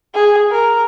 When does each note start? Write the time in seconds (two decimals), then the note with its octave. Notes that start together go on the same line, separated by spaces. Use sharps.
0.14 G#4
0.51 A#4